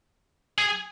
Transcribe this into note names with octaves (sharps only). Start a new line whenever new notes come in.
G#4